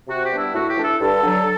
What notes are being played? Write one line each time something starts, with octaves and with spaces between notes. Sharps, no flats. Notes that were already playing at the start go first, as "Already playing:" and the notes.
C3 F#4
G4
G3 B3 D4
E4
A2 F#4
G4
E3 A3 D4
A4
G2 A4
D3 F#3